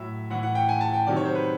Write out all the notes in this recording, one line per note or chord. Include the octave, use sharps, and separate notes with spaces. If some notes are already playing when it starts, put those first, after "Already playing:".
Already playing: A2 F#3 E5
A2 E3 F#5
F#5
G5
G#5
A5
G5
C3 D#3 F#3 D5
C#5
C5
B4